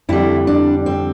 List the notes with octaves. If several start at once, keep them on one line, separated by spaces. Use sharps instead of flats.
F2 D3 G3 E4
D4
C4